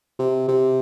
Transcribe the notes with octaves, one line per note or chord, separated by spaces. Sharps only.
C3
C3